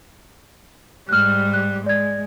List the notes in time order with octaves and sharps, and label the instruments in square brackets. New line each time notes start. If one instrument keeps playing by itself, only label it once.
[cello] G#2 G3 [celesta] F6 F#6
[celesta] F#6
[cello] G#3 [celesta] D5 G#6